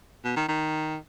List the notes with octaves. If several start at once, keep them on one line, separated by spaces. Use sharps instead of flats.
B2
D#3
D#3